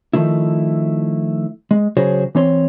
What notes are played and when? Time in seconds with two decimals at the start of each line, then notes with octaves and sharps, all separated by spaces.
0.13 D#3 F3 A3 E4
1.71 G#3
1.97 C#3 F#3 F#4 G#4 C5 C#5
2.35 E3 C4 C#5 C6